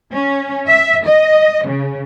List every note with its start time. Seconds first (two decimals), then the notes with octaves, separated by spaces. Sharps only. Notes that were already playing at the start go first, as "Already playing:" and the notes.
0.11 C#4
0.67 E5
1.06 D#5
1.67 C#3